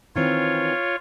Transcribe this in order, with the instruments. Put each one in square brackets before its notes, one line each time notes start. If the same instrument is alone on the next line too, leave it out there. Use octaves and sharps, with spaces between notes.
[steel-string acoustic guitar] D#3 E3 C4 [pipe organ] F4 C#5